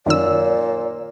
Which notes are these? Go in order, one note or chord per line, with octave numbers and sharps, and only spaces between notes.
F#2 A#2 D#3 C#5 D5 E6